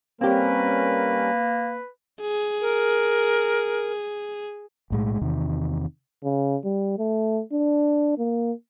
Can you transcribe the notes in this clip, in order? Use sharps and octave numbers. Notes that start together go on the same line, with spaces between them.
G3 A#3 C4 C#4 G4 A#4 B4
G#4
A#4
B1 A2 G#3
E2 C3 D#3
C#3
G3
A3
D4
A#3